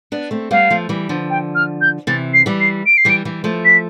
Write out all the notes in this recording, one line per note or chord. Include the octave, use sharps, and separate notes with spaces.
B3 D4
A3 C4
G3 B3 F5
F3 A3
E3 G3
D3 F3
G5
F6
G6
C3 E3 A6
C7
E3 G3
C7
D7
C7
E3 G3 D7
E3 G3
F3 A3
B6